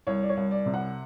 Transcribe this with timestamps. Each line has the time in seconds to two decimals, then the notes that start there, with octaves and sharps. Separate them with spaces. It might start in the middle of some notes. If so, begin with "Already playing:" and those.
0.07 C2 C#5
0.23 D5
0.29 C#5
0.37 C2
0.51 D5
0.66 C3
0.74 F#5